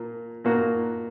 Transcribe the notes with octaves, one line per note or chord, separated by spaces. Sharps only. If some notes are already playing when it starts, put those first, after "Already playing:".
Already playing: A#2 A#3
A#2 A#3 F#4